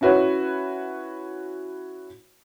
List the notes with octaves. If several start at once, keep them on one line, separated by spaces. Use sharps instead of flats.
C#4 E4 F#4 B4 C#5